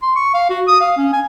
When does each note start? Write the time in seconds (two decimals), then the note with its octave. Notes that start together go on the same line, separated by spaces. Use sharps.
0.02 C6
0.16 C#6
0.34 F5
0.49 F#4
0.68 D#6
0.80 F5
0.97 C#4
1.13 G#5